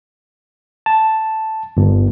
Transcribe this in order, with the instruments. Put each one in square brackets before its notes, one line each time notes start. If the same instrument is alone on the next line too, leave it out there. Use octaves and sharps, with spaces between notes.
[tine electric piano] A5
G1